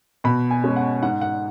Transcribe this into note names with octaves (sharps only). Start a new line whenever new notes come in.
B2 B5
G#5
G#3 C#4
F#5
G#2 F#5
F#5